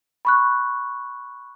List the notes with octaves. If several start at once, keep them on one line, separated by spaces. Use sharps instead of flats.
B5 C#6 F#6